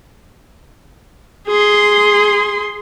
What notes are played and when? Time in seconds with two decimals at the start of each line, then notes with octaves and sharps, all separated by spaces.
1.48 G#4 C6